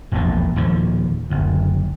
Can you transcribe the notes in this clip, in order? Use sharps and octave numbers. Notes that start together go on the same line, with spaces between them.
E1 A#1 E2 A#2
D#2 A#2 F3
F#1 D2